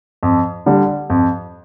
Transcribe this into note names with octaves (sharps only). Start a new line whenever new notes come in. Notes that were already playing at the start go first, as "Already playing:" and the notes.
F2
D3 G3
F2